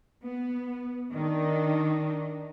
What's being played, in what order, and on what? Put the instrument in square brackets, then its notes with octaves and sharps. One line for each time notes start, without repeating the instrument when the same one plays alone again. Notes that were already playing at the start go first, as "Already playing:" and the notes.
[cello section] B3
D#3 D4 D#4